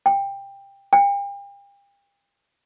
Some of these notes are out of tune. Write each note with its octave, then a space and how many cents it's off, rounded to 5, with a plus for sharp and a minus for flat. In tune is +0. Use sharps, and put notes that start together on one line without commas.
G5 +15
G5 +40